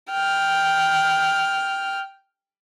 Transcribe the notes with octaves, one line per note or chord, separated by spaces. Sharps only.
G5 F6